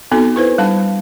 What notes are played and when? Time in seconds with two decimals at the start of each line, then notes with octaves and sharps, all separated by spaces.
0.12 B3 C4 D#4 F#4 A4
0.35 B3 E4 B4 C5
0.58 G3 D4 F#5 A5